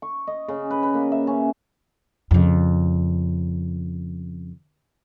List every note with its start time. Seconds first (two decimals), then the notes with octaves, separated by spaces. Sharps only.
0.02 C#6
0.27 D#5
0.48 C#3
0.71 B4
0.83 B4
0.94 A#3
1.12 E5
1.27 C#4
2.31 F2 C#3